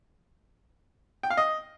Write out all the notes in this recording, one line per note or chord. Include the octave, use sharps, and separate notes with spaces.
G5
F5
D#5